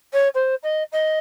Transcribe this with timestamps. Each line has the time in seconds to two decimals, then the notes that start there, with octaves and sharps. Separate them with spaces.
0.13 C#5
0.35 C5
0.63 D#5
0.92 D#5